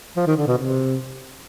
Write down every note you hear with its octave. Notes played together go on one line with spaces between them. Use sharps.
F3
D#3
D3
B2
C3